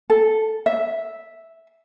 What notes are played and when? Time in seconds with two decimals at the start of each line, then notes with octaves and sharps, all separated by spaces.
0.10 A4
0.66 E5